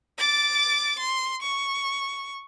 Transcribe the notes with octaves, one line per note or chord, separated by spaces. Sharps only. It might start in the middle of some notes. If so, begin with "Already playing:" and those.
D6 A6
C6
C#6